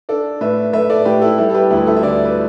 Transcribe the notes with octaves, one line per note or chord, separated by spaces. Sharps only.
D4 A4 D5
A2 B4 E5
A3 B4 E5
A4 D5
A2 G4 B4
E4 A4
G3 E4 A4
A4
G4 B4
D2 E4
E4 A4
E5
D3 A4 D5
B4